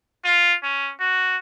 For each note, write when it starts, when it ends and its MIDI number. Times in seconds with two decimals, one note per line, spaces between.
0.25 0.55 65
0.63 0.92 61
1.00 1.37 66